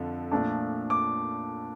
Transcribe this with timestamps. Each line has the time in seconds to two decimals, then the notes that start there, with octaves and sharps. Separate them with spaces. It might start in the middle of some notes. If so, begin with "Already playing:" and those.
Already playing: F2 D3 F3
0.32 A#2 F3 A3 D4
0.90 D6